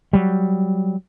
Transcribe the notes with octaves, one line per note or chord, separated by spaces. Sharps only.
F#3 G3